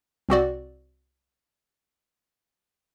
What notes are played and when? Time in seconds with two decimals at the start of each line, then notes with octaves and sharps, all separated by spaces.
0.29 C2 C4 F#4 D5